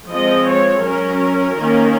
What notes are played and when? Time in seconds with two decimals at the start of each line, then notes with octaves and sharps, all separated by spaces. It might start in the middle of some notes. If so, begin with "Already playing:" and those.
0.11 F3 G#3 C4 D#5
0.48 C#5
0.85 F#3 C#4 A#4
1.59 D#3 A#3 C#4